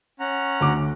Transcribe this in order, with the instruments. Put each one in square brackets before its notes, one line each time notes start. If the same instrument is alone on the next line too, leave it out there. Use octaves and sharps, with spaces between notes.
[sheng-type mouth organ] C#4 F#5 A#5
[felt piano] D2 D6